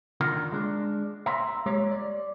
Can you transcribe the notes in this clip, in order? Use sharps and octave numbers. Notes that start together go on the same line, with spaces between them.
D3 D#3 F4 F#4 A#4
G#3 D4
E5 A#5 C6
G#3 G4 C#5
D5